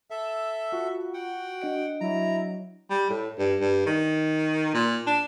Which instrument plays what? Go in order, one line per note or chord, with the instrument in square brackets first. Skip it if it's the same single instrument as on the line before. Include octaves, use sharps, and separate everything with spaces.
[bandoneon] A4 E5 [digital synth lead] E6
[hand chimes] F4 [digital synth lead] F#4
[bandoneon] F#5 G5
[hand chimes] D4 D#5 D7
[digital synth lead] F#3 [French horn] E4 [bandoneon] A#5
[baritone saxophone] G3
A2
G2
G2
D#3
A#2
D4